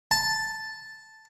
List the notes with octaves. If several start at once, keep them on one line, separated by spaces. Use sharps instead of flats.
A5